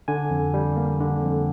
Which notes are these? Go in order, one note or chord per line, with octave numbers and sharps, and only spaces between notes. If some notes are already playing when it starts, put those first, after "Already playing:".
D3 G#5
F2
G3
A#3
D3
F2